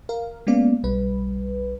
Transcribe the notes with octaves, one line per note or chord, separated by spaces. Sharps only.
A#4 F5
G#3 A#3 B3 C#4 D5 F5
B1 G3 B4